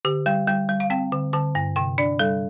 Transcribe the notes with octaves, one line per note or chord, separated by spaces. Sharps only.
D3 G4
G3 G5
G3 G5
G3
F5
C4 G5
D3
D3 A5
G2
C3 G5
D4 D5
G3 A4